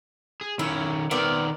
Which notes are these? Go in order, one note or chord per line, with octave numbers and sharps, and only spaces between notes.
G#4
D#3 C#4 E4
D#3 B3 C4 A#4 D5